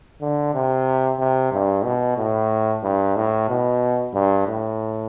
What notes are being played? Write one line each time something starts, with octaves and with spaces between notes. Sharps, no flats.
D3
C3
C3
G2
B2
A2
G2
A2
B2
G2
A2